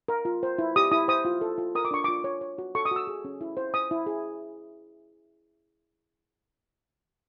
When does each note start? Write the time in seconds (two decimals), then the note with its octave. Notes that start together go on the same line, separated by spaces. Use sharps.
0.08 A#4
0.25 F4
0.43 C5
0.58 E4
0.76 G4 D#6
0.91 E4 D#6
1.08 C5 D#6
1.25 F4
1.41 A4
1.58 F4
1.75 A#4 D#6
1.85 D6
1.91 D4 C#6
2.04 F4 D6
2.24 C#5
2.41 C#5
2.58 F#4
2.75 A4 C#6
2.85 D#6
2.91 F#4 E6
3.07 G#4
3.25 C#4
3.41 E4
3.57 C5
3.74 C5 D#6
3.91 E4
4.06 G#4